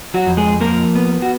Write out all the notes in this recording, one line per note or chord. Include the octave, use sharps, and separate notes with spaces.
F#3 F#4
F2
G#3 G#4
F3 A#3 A#4
B3
F#4